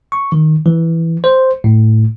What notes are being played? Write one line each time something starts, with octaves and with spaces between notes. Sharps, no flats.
C#6
D#3
E3
C5
A2